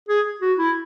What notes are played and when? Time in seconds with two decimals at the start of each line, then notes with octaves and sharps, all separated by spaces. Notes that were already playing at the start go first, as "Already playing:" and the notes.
0.09 G#4
0.41 F#4
0.58 E4